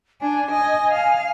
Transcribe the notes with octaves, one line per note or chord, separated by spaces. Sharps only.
D4 G#5
D#5
F5